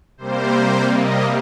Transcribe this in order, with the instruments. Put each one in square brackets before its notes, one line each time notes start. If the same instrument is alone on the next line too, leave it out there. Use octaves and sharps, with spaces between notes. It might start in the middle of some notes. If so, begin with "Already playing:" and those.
[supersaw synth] C3 G3 A#3 C5
D#5